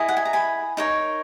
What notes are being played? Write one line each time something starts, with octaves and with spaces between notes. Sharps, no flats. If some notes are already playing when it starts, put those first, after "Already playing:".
Already playing: E4 G#4 D#5
F#5
G#5
A#5
G#5 B5
D#4 A#4 C#5